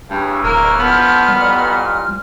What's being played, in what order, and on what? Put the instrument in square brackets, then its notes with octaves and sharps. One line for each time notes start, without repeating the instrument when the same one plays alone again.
[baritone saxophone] G2 [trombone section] C#3 E3
[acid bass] D1 [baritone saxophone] A#3 [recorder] F6
[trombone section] D2 F3 [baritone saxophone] B3
[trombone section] A1 F2 A#2 [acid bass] G3